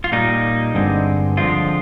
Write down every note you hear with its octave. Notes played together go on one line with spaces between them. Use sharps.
F4
A#2 G3 A#3 D#4
G2 D3 G#3 C4
D3 F3 G#3 C4 F4